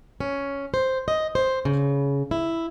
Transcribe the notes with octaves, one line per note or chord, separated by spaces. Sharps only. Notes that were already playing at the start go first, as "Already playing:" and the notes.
C#4
C5
D#5
C5
C#3
E4